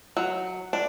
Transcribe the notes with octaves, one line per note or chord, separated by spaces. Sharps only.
F#3
D4